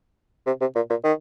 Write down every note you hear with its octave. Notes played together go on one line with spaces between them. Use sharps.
C3
C3
A#2
A#2
D#3